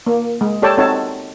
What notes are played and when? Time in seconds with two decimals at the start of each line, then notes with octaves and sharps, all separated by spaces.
0.06 A#3
0.41 G#3
0.62 G4 A4 C#5 D5 G5 A5
0.78 C4 D#4 F#4 A4 C#5 A5